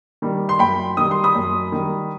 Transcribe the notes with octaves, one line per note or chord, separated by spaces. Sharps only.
D#3 G3
C6
F#2 G5 B5
D#3 G3 D#6
C6
B5 D#6
F#2
D#3 G3